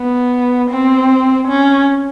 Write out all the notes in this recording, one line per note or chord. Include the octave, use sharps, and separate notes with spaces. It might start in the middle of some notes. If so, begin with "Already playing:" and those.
Already playing: B3
C4
C#4